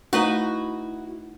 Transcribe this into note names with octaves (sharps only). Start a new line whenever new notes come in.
A3 D#4 E4 F#4 B4 D#5 A#5